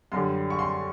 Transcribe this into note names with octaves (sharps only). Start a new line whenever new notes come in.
F#2 D3 G3 C6
C#6
C6